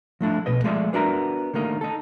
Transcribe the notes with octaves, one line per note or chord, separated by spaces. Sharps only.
F3 A3 D4 E4
B1 B2 B4 D#5
F3 G#3 A3 G#4 D5 E5
B3 D4 F#4 A#4 E5 A#5
D3 D#3 A3 A#3 D#4
D#4 A4